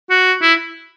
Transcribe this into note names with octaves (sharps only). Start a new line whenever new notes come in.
F#4
E4